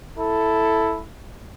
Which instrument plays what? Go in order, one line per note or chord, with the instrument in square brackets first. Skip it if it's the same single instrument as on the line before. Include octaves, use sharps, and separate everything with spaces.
[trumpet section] E4 A4